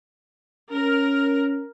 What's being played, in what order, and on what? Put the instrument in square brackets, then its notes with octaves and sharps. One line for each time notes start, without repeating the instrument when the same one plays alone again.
[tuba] C#4 [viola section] A#4